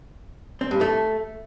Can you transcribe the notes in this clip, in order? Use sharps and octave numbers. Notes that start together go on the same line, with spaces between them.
C4
G2
A3